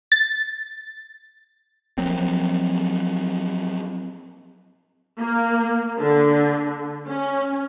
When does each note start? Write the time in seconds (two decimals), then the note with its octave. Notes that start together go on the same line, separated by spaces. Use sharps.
0.12 A6
1.98 F3 F#3 A#3 C4
5.18 A#3
5.99 D3
7.07 C#4